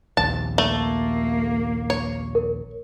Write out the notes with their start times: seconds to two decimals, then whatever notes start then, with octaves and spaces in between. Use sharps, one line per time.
0.17 A#1 D#2 A5
0.58 A3 A#3
1.90 C#5
2.35 A#4